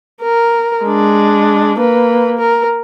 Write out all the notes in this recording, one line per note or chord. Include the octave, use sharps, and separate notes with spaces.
A#4
G#3 D4
A#3 B4
A#4